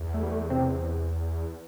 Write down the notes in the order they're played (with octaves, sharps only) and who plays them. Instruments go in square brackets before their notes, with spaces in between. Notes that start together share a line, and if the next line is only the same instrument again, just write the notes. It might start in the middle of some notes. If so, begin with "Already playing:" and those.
Already playing: [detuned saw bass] E2
[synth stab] A3
G3
A3
C3 C4